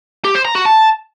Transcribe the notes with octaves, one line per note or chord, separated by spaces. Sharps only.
G4
C5
A#5
F#4
A5